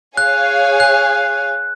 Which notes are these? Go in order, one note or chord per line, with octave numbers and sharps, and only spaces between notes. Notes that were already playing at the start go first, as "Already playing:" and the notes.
G#4 C#5 F5 G#5 F#6
F#6